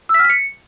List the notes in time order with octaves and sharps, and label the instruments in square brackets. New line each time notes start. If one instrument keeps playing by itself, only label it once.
[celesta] E6
B6
F6
B6
C#7